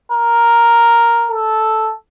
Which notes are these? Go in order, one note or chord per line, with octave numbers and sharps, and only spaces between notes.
A#4
A4